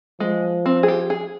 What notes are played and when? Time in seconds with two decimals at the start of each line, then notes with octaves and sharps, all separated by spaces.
0.20 F3 G#3
0.66 C4
0.83 G#4
0.88 G4
1.10 G#4